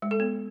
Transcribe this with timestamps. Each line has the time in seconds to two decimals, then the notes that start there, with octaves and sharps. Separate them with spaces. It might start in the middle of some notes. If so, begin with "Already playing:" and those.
0.02 G#3
0.11 A4
0.20 B3